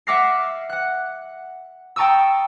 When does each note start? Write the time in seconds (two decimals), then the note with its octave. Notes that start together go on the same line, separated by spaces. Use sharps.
0.07 E5 F#5 D6 F6 A#6 C7
0.69 F#5 F#6
1.96 G5 A5 A#5 C#6 D#6 E6